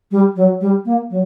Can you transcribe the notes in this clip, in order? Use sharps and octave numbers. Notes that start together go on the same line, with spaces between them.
G3
F#3
G3
A#3
F#3